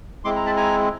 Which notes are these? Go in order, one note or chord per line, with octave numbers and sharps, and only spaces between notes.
G#3 C4 E4 C6 D6
A#5
A5 B5
G#5 A#5